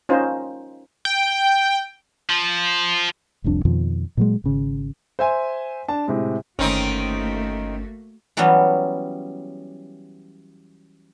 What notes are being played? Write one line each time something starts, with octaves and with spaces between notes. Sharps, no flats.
C#4 D#4 F4 C5
G5
F3
F1 C2 F2 D4
F2 B2 D#3 F3
A#2 F#3 G#3
G#1 C#3
C5 E5 G#5
D4 A5
A2 C3 G#3
G1 D#3 A3 A#3 C4 C#4 D#4 F#4
E3 F#3 G3 B3 C#4